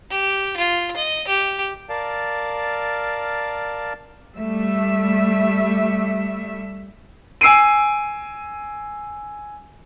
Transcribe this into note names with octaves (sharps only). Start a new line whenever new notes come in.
G4
F4
D#5
G4
A#4 D5 F5 A5
G3 A3 E5
G#5 E6 C7 D7 D#7